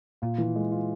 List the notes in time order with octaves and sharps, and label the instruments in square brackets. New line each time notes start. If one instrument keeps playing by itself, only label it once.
[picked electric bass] A#2 [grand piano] F4
[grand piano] E3
G#3
F4